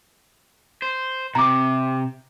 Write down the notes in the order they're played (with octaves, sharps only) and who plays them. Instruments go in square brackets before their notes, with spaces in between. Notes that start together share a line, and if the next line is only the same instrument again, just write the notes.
[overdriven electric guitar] C5
[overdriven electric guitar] C3 [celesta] A#5 D6